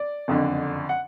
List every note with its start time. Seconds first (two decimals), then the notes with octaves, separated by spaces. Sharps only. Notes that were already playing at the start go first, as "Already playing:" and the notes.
Already playing: D5
0.28 F#1 F2 D3
0.89 F#5